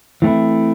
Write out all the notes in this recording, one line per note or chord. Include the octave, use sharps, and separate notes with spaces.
E3 A3 C4 E4